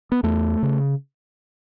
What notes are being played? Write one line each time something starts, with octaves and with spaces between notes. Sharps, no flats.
B3
E2 A3
C#3